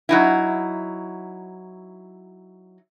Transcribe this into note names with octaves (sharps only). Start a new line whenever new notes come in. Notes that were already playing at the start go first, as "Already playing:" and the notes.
F#3 D#4 E4